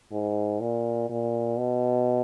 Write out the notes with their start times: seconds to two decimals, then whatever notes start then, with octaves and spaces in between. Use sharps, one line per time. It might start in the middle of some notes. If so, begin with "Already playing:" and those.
0.12 G#2
0.60 A#2
1.10 A#2
1.58 B2